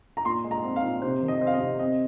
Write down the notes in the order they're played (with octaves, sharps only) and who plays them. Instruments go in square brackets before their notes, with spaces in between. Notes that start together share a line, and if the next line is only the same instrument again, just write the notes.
[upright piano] A#5
A#2 C6
G#3
A#5
C4
F5
A#2
C3 C5
D#3
D#5
C4
F5
D#5
C3
C4 D#5